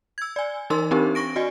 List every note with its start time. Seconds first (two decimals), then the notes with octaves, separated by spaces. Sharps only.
0.18 E6 G#6
0.36 D5 G#5
0.70 E3 D#4 A#4 C6 E6
0.91 C4 D4 D#4 G4 A#4
1.15 C#6 A#6 D7
1.36 F#4 D5 D#5 G#5